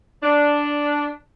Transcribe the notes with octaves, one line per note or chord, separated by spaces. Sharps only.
D4